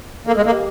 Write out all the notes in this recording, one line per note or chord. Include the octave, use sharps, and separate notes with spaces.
A#3 A4
G#3
A4
A#3
G4